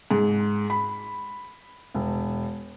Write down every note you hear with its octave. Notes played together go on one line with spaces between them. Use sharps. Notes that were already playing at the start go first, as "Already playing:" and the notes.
G#2
B5
E1